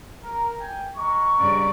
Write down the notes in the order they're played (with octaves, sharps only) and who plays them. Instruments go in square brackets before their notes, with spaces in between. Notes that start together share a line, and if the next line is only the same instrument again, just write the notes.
[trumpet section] A#4
G5 G#5
G#3 A#5 C#6
[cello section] G2 C#3 D5